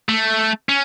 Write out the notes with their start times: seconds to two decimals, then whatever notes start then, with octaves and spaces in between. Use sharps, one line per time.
0.09 A3
0.69 C#4